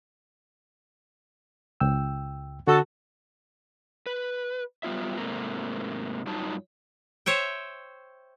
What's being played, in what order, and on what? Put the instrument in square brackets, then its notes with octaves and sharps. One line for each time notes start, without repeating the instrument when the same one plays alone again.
[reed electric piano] C#2 G5 E6
[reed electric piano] D3 [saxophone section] F#4 A4
[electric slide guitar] B4
F#3 G3 B3 F4 E5
G#2 C3 A3 A#3
G2 F#3 G3 D#4 F4 A5
[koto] C5 C#5 E5 G5